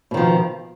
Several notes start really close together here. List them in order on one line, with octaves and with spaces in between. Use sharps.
B2 D#3 F3